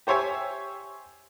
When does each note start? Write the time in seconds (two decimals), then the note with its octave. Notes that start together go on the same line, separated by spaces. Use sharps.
0.07 G4 C5 C#5 E5 G#5